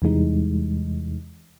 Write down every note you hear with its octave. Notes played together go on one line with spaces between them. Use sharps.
E2 C3 E3 G3 G#3 D#4